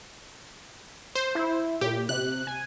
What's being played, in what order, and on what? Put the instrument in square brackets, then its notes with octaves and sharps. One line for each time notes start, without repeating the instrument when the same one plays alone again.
[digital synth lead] C5
[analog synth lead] E4
[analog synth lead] A#2 [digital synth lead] G4
[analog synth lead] C3 [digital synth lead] F#6
[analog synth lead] G#5